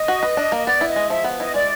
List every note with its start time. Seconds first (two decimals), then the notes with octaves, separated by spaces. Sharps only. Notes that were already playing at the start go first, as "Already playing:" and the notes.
Already playing: D#5
0.08 F#4
0.23 B4
0.37 D4
0.52 A#3
0.67 B3 D5
0.81 E4
0.89 D#5
0.96 G#3
1.10 F3 E5
1.24 B3
1.40 E4 D#5
1.54 G#3 D5